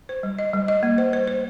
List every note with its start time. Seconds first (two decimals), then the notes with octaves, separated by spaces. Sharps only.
0.09 C5
0.23 G3
0.39 D#5
0.54 G3
0.68 D#5
0.83 A#3
0.98 C5
1.13 C5
1.28 C5